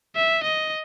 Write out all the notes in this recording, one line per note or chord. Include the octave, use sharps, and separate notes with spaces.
E5
D#5